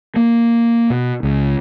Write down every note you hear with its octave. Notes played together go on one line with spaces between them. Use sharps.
A#3
B2
C#2